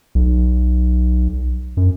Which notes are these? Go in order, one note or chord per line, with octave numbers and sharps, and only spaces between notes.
B1
F#2